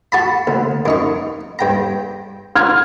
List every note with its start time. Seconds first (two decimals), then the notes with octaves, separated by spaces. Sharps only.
0.12 F#4 A5 B5
0.47 D2
0.86 F#2 D#4 C#6
1.59 G2 G5 A#5
2.55 F6 G#6